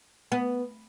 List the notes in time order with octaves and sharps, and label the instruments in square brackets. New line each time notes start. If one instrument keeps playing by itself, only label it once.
[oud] B3